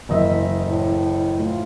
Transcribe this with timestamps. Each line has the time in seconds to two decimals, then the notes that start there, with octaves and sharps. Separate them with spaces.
0.09 F#1 E3 D#5 E5
0.66 A2 A4
1.39 A3 F4